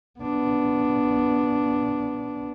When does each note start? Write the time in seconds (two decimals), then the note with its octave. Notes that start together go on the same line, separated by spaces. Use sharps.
0.20 B3 D4